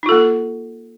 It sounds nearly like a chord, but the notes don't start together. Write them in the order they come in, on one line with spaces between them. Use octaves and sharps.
D#4 F4 A4 A#3